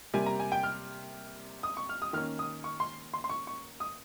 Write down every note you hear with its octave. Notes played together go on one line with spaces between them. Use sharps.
C3 G3 A#3 G#5
A#5
G#5
G5
F6
D#6
C#6
F6
D#6
D#3 A#3 C#4 F6
D#6
C#6
C6
C6
C6
C#6
C#6
D#6